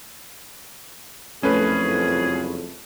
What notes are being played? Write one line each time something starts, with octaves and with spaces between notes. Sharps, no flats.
F#1 C2 F2 A3 C#4 G#4 B4